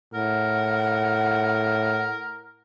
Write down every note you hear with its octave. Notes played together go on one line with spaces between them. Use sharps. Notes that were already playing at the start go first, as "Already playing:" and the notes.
A2 A#4 F#5